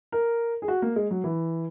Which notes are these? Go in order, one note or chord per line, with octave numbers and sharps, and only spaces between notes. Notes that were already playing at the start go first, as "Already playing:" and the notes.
A#4
G#4
F#4
A#3
G#3
F#3
E3